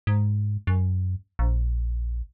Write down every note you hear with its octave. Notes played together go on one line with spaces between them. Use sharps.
G#2
F#2
A#1